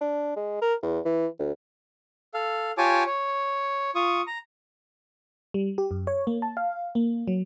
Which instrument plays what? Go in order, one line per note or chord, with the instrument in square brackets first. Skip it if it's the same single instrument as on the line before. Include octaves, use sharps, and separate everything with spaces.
[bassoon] D4
G#3
A#4
E2
E3
D2
[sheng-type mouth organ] A4 F5
F4 G4 C#5 G#5 A5 D6
C#5
F4 C#6 D#6
A#5
[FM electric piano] G3
G4
F#2
C#5
A#3
A5
F5
A#3
F#3